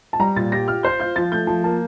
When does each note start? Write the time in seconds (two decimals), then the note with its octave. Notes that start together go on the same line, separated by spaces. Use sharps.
0.13 A5
0.19 G3 A#5
0.36 A#2 A6
0.52 G4 A#6
0.68 F4 F6
0.83 C5 G6
1.00 F4 G6
1.16 F3 A6
1.32 A3 G6
1.47 F3 A5
1.64 A#3 A5